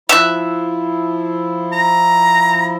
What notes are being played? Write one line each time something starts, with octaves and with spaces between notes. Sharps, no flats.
F3 E4 E5 F#6
A#5